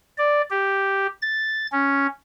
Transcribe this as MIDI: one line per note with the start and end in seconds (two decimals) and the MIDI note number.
0.18 0.41 74
0.50 1.07 67
1.22 1.66 93
1.72 2.07 61